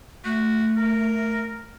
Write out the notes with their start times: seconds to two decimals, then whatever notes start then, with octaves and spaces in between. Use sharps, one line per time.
0.25 A3 F#4
0.76 A#4